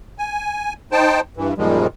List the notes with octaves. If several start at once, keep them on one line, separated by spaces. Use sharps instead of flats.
G#5
D#4 C5 G5 A5
G2 E3
F#2 A#2 D#3 F3 G3 G#3